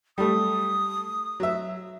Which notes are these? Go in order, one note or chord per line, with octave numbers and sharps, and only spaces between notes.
G3 A3 D#6
F#3 E5